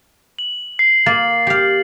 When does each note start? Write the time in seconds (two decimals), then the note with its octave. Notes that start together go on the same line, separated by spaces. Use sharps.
0.39 F#7
0.79 C7
1.06 A#3 A6 F#7
1.47 G4 F5